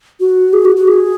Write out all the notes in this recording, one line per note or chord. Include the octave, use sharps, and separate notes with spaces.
F#4
G#4
F#4
F#4
G#4